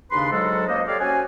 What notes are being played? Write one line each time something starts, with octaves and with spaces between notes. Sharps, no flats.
D#2 C#3 D4 B4 C6
G#2 F#3 G#3 F#4 A4
C#2 A#3 C5 D#5
G4 A4 C#5 D5 F5
C#4 F#4 C5 F#5 G#5